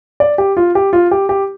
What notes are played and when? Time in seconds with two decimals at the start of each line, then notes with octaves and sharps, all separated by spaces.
0.20 D5
0.38 G4
0.57 F4
0.75 G4
0.93 F4
1.11 G4
1.29 G4